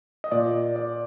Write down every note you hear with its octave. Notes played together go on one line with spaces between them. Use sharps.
D#5
A#2 D5
D5